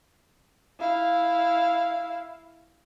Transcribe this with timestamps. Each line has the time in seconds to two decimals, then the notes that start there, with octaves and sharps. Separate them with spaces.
0.79 E4 F5